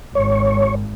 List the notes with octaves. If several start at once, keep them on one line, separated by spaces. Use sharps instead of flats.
G#1 C#5